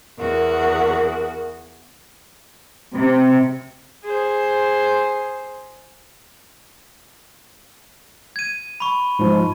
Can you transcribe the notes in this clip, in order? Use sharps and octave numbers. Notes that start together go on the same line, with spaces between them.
E2 F#4 A#4
C3
G#4 C5
G#6 D#7
B5 C#6
G#2 F3